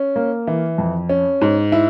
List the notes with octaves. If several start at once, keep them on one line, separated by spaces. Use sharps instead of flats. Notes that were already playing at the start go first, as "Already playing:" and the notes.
Already playing: C#4
A#3
E3
F2
C#4
G#2
E4